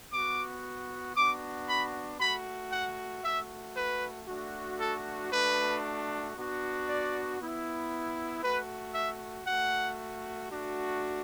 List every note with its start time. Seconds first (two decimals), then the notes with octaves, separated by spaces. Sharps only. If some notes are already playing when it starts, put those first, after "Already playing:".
0.12 B3 F#4 D6
1.16 B3 D4 F#4 D6
1.68 B5
2.20 A3 F#4 B5
2.72 F#5
3.24 A3 F#4 E5
3.76 B4
4.28 A3 D4 F#4
4.79 A4
5.31 A3 D4 F#4 B4
6.35 B3 D4 F#4
6.87 D5
7.39 B3 E4
8.42 A3 F#4 B4
8.94 E5
9.46 A3 F#4 F#5
10.50 A3 D4 F#4